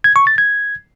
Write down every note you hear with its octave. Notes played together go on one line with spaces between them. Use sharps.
G#6
C#6
A6
G#6